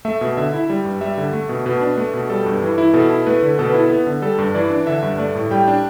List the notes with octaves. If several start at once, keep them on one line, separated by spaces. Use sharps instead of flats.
A3 E5
B2
D3 E5
E4
G3
G2
G3 E5
D3
A3
B2
B2 B4
D4
A3
B2
G3 A4
G2
E3
E4
B2 A4
E4
A3 B4
D3
B2 A4
E4 B4
A4
B3
D3
G3 A4
G2
E3 D5
D4
D3 E5
G2
A3 D5
A2
G3 G5
D4